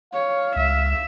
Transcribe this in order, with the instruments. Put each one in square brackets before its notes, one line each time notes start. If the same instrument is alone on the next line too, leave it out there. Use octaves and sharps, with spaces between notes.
[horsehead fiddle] C#5 [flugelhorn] F5
[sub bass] C#2 [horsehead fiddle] E5